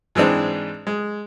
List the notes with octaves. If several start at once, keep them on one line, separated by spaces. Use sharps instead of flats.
G#2 E3 G#3 C4 D4
G#3